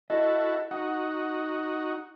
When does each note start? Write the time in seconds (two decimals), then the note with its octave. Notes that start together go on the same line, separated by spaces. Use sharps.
0.10 E4 F#4 A4 D#5
0.71 D#4 F#4 F#5